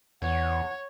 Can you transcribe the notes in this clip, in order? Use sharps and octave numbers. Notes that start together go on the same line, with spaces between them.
E2 C#5 F#5